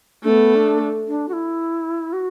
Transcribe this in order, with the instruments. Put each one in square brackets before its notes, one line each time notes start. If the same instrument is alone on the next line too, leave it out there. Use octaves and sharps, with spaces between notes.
[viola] A3 [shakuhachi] D4
[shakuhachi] B3
D4
D4
F#4
E4
F#4